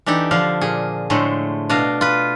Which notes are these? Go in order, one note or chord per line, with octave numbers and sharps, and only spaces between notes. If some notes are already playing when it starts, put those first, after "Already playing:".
E3 D4 D#4 G4 A4
D3 F3 D4 F5
A#2 G#4
A2 D3 G#3 A3 C5
B2 D4 D#5 F5
F4 B4